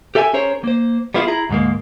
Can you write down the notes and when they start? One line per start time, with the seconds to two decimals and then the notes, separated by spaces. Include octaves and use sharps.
0.15 G4 A4 E5 G5 G#5
0.33 C#4 G#4 A#4 C5 C#5
0.64 A#3 C5
1.14 G3 B3 E4 F4 G#4
1.28 E4 G#4 A#5
1.49 D2 G#2 G#3 A#3